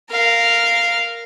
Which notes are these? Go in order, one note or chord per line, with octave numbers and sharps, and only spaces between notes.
A#4 F5